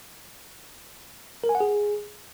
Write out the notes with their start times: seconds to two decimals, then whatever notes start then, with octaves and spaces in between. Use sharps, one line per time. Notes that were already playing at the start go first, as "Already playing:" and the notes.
1.44 A#4
1.49 G#5
1.55 F#5
1.61 G#4